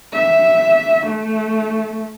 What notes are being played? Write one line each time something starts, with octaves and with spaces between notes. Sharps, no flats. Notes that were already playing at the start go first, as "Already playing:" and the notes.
E5
A3